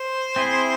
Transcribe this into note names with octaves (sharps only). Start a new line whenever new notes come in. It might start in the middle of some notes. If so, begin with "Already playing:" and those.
Already playing: C5
C4 E4 G#4